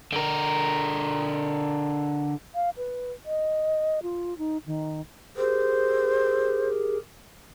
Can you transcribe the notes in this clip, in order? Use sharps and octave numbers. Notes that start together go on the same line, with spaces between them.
D3 A#4
F5
B4
D#5
F4
D#4
D#3
G4 G#4 A#4 C5